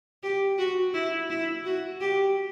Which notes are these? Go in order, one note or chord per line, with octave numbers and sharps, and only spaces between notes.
G4
F#4
E4
E4
F#4
G4